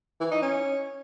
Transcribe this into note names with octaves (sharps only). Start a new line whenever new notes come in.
E3
D#4
C#4